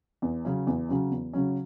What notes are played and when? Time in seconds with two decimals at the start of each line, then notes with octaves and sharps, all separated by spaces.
0.22 E2
0.45 C#3 F#3 C#4
0.67 E2
0.89 C#3 F#3 C#4
1.11 E2
1.33 C#3 F#3 C#4